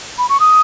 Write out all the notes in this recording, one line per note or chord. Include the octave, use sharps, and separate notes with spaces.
B5
C#6
D#6